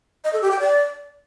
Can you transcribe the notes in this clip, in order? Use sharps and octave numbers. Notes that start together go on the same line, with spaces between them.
D#5
A4
G4
G5
D5